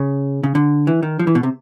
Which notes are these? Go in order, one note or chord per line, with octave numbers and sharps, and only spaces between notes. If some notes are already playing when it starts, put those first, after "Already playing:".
Already playing: C#3
C#3
D3
E3
D#3
F3
E3
B2
C3